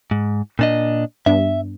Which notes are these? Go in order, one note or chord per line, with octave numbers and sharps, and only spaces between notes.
G#2
A#2 D4 D#5
G2 B3 D4 E5